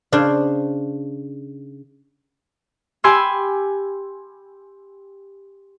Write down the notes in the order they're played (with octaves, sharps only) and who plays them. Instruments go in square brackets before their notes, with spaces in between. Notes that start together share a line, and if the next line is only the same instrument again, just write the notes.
[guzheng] C#3 D4 C5
[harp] G4 G#5 B5 C6 E6